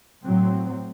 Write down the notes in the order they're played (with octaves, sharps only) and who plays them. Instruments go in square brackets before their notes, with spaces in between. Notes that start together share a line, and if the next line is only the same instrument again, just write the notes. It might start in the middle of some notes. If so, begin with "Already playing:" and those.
[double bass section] A2 F#3 C4